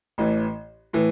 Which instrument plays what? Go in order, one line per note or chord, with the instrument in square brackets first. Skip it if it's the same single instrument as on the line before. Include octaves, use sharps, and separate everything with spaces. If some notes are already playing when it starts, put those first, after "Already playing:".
[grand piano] A1 A2 E3
A2 E3